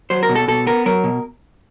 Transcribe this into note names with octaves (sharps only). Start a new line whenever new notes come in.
F#3 C5
A#4
B2
A4
B2 A4
B3 A#4
F#3 A#4
B2